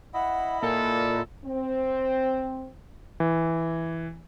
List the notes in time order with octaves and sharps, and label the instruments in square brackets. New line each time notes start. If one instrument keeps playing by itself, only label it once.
[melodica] E4 D#5 B5 [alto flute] F#5
[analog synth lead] A#2 [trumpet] A4 [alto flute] A#4
[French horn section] C4
[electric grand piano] E3